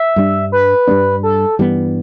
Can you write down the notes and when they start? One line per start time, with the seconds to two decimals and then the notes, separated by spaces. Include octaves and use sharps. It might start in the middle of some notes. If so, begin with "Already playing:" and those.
Already playing: E5
0.16 G2 G3 D4
0.52 B4
0.87 G2 G3 B3 D4
1.23 A4
1.59 G2 E3 G3 B3